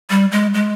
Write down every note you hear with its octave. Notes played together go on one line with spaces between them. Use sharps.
G3
G#3
G#3